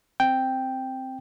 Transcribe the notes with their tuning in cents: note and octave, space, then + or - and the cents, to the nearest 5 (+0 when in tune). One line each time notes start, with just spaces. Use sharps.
C4 +0 G5 +0